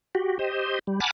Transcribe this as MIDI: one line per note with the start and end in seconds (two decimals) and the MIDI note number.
0.15 0.38 66
0.15 0.38 67
0.39 0.79 67
0.39 0.79 72
0.39 0.79 75
0.87 1.00 55
1.00 1.11 78
1.00 1.11 80
1.00 1.11 81
1.00 1.11 83
1.00 1.11 86
1.00 1.11 89